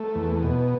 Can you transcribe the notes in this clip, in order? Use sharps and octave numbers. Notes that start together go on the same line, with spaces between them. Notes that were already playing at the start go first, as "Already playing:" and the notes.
Already playing: A3
E2
B2